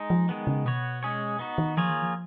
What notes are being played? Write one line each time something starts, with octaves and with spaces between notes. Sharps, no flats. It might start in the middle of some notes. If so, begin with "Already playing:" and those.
Already playing: G#3 D#4
F3
D#3 G#3 B3
C#3
B2 B3 F#4 C#5
G#3 C#4 G#4 C#5
B3 D#4 F#4
D#3
F3 A#3 F4 G#4 C#5
D#3
F3